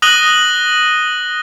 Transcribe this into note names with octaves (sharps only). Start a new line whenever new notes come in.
D#6 F#6 A#6 D#7 F#7 G7